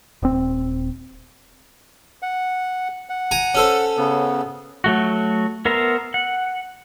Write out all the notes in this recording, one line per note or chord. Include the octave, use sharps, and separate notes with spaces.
D#1 C4
F#5
F#5
G#5 A#5
C#4 A4 C5
C#3 B3
F#3 A3 F#4
B3 A#4 C5 E5 A#5
F#5